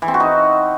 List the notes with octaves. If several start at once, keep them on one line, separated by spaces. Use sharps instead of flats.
E3
C4
F#4
D#4